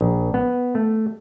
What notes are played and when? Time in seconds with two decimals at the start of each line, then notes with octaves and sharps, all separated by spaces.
0.01 A#1
0.34 B3
0.75 A3